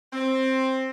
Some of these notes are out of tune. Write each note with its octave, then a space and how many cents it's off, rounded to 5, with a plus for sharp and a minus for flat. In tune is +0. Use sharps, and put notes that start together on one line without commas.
C4 +10